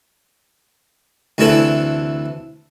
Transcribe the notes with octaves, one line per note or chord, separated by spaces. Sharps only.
D2 C3 E3 A3 E4 A4